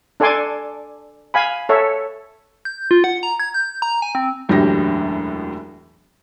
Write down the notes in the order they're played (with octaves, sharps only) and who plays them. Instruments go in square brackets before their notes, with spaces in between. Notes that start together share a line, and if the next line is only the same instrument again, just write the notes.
[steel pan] D4 A4 D5 G#5 C6 D6
F5 G#5 B5
A4 C#5 E5
[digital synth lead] G6
F4
F#5
A#5
G#6
G6
A#5
G#5
C4
[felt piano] E1 F#2 A2 D3 G4 A#6